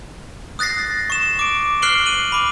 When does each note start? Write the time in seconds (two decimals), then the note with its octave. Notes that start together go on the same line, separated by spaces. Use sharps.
0.59 D#6 F#6 A6 A#6 C7
1.10 C#6 E7
1.39 D6 D7
1.82 F6 F#6 C7 D7 F#7 G7
2.06 D#7 F#7
2.32 B5 D6